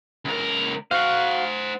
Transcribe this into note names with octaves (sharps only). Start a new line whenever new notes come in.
C#2 A#4
F#4 C5 F5 F#5